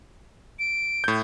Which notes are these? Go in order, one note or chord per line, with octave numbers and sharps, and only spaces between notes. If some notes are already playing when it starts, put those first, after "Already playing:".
D7
A2 G6